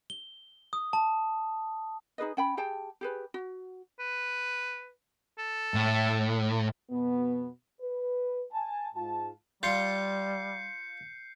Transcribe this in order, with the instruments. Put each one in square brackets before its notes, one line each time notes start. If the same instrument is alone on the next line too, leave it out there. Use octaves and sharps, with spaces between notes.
[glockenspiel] G7
D#6
A5
[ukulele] D#4 G#4 B4 D#5
C#4 G5 B5
G4 G#4 G5 A5
G4 G#4 B4
F#4
[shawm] B4
A4
[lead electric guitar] A2
[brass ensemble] F2 B2 B3
B4
G#5 A5
G#2 F4 A5
[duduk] G3 [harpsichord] F4 [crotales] G6 C7 C#7